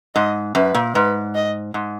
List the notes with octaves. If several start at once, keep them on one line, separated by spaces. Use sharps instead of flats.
G#2 D#5
F#2 B4
A#2
G#2 B4
D#5
G#2